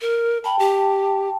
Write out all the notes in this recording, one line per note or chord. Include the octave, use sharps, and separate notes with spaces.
A#4
G5 A5 B5
G4